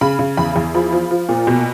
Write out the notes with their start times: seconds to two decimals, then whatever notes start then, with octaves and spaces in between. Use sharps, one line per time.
0.01 C#3 B5
0.19 C#3
0.37 E2 B5
0.56 E2
0.74 F3 B5
0.92 F3
1.11 F3
1.29 A#2
1.47 B2